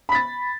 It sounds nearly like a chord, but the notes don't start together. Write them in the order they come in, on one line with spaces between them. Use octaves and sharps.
B5 B6 A6